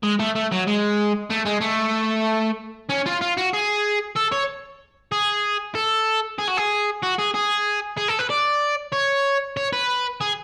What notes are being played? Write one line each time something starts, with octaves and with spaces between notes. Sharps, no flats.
G#3
A3
A3
F#3
G#3
A3
G#3
A3
C#4
F4
F4
F#4
G#4
A4
C#5
G#4
A4
G#4
F#4
G#4
F#4
G#4
G#4
G#4
A4
B4
D5
C#5
C#5
B4
G#4